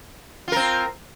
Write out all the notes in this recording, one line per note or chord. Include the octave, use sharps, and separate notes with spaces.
C4 F4 A#4